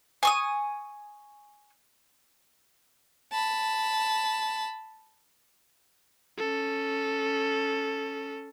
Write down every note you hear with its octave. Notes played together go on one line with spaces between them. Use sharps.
G#5 C#6 D#6
A5 B5
C#4 A4